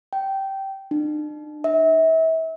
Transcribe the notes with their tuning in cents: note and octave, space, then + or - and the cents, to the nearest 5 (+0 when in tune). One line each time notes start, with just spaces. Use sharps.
G5 -15
D4 +45
E5 -35